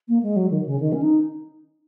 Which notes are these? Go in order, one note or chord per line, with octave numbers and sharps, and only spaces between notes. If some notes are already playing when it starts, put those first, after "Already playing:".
A#3
G#3
F#3
D#3
C#3
D#3
C#4
D#4